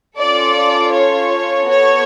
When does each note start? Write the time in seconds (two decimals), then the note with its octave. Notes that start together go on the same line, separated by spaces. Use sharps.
0.18 C#4 F4 A4 D5
0.93 C#5
1.69 B3 F#4 A4 C#5